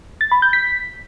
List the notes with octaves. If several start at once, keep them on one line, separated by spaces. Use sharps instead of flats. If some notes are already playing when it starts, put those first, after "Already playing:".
A6
B5
G6
B6